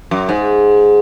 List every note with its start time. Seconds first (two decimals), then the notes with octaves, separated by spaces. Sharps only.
0.11 F#2
0.29 G#2